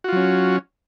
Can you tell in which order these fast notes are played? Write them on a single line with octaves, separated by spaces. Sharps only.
F#4 F4 F#3 C#4